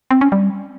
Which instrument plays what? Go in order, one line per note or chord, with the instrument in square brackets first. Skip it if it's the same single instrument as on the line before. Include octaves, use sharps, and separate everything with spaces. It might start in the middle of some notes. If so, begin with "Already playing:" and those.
[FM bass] C4
C#4
G3